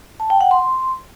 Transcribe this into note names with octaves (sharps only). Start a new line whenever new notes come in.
A5
G5
F#5
C6